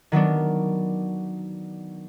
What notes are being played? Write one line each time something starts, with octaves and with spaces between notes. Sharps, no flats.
D#3 F#3 B3 D4